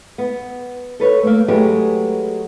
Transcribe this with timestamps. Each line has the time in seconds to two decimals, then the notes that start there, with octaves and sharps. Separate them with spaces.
0.18 B3
1.00 A4 B4 C#5
1.23 A3 A#3
1.48 F#3 G#3 A3 G4 B4